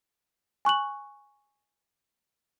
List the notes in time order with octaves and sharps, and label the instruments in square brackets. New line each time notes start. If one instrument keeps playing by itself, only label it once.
[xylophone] G#5 C#6 F#6 F#7